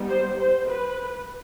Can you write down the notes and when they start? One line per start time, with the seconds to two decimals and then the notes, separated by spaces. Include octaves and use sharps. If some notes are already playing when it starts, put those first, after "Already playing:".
Already playing: G3 B3 D#4
0.09 C5
0.38 C5
0.69 B4